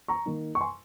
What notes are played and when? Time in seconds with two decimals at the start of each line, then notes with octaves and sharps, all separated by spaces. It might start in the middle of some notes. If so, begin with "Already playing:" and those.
0.08 A#5 C#6
0.26 D#3 A#3 D#4
0.55 C#6
0.61 G#5 C6